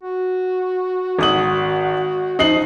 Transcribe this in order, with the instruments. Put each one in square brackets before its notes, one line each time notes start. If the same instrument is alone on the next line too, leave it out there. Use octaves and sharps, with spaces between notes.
[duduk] F#4
[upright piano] G#1 D#6 F#7
[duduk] F3 [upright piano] D#4 C7 F#7